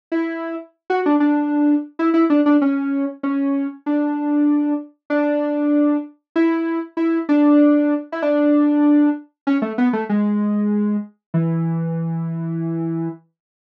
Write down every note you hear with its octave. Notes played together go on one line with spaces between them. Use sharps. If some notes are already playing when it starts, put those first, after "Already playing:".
E4
F#4
D4
D4
E4
E4
D4
D4
C#4
C#4
D4
D4
E4
E4
D4
E4
D4
C#4
A3
B3
A3
G#3
E3